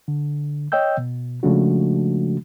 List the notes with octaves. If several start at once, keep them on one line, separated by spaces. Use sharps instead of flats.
D3
C#5 D#5 G5 E6 G6
B2
C#3 F3 G#3 A3 D4 F#4